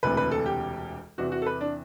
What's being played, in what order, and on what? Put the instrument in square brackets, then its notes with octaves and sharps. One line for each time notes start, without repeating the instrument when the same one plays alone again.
[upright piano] E1 D2 C3 E3 B4
B4
A4
G4
E2 C3 E3 F#4
F#4
A4
B4
D4